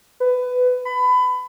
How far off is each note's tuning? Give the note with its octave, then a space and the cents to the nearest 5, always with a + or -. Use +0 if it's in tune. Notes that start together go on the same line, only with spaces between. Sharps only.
B4 +20
B5 +25